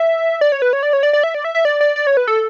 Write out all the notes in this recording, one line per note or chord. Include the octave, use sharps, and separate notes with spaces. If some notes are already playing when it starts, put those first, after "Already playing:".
Already playing: E5
D5
C#5
B4
C#5
D5
C#5
D5
D5
E5
D5
E5
E5
D5
D5
D5
C#5
B4
A4